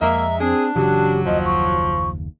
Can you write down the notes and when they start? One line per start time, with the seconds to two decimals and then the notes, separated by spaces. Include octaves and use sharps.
0.02 F2 G#3 A#3 E5 A#5
0.40 C4 D4 G#4
0.76 F#1 C#3 E3 F#3 G4
1.26 F#1 D#2 F3 D#5
1.45 C#6